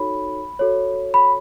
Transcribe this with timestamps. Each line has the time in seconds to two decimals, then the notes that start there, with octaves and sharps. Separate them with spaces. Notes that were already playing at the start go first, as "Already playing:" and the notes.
Already playing: D#4 F#4 A4 C#5 B5
0.59 F#4 A4 C#5
1.14 B5